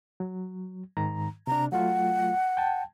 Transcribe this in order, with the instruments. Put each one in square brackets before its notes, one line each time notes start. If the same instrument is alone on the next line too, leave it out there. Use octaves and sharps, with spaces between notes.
[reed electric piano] F#3
G#2 D#3 A#5
[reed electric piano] C3 D4 [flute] A#5
[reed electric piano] F#3 A3 F4 [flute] F#5
[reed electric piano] G5 A5